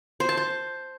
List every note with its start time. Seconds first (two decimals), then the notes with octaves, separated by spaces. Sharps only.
0.20 C5
0.29 A5
0.37 C5